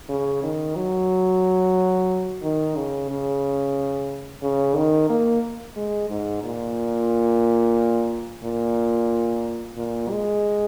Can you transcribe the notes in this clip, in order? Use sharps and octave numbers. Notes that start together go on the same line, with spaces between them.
C#3
D#3
F#3
D#3
C#3
C#3
C#3
D#3
A#3
G#3
G#2
A#2
A#2
A#2
G#3